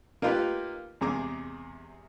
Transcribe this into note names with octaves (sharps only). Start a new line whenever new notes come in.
A#3 D#4 F4 G4 B4
E2 C3 G#3 G#4 A#5 D6